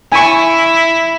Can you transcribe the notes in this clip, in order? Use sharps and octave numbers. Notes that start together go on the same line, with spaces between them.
E4 G#5 C#6